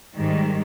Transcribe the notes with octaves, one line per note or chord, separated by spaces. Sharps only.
G#2 D#3 G3